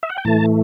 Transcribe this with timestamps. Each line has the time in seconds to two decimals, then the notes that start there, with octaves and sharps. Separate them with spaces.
0.03 E5
0.10 F#5
0.18 G5
0.25 A2 E3 A3 A5